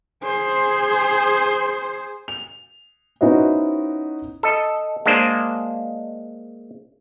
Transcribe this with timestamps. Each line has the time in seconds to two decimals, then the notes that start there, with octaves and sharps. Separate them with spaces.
0.24 G#4 C5
2.28 F7
3.21 B3 C#4 D#4 E4 F#4 C5
4.43 A4 D#5
5.06 G#3 A#3 D4 C5